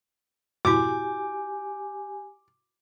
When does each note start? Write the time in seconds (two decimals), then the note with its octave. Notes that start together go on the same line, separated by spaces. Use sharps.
0.65 F2 G#2 B2 E4 F#4 G4 G#5 D6